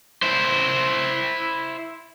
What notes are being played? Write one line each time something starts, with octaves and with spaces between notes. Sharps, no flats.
E4 C5